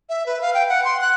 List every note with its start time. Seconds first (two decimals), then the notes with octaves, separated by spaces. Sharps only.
0.09 E5
0.26 B4
0.41 F5
0.54 G5
0.69 F#5
0.85 C6
1.01 F#6